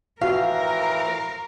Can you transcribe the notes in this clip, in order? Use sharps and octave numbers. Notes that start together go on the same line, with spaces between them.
A2 E3 F3 F#4 A#4 F5